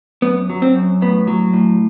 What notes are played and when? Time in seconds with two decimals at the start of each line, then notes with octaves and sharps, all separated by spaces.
0.22 F#2 B3
0.50 F#3
0.62 C4
0.75 F#2
1.01 A2 B3
1.27 F#3
1.53 A2